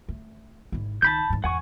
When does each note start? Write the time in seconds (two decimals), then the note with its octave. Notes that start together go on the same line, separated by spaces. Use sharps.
0.08 A3
0.72 G#1 E4
1.02 C#2 D#3 A5 B5 G6
1.30 E2 G#2
1.44 E2 G#2 F#5 G#5 C#6